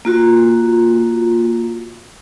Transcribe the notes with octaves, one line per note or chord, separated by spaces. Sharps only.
A#3 F4 F#4